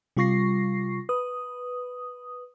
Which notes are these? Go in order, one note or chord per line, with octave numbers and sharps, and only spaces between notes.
C3 G3 F4 C#6 A#6 C7
B4 D#6